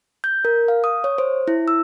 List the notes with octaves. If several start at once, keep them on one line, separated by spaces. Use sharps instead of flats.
G6
A#4
F5
D#6
C#5
C5
E4
E6